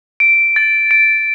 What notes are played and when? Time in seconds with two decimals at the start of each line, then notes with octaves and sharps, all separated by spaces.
0.20 D7
0.56 A6
0.91 D7